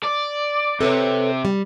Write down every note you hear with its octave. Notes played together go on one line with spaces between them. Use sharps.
D5
C3 A4 B4 C#5
G3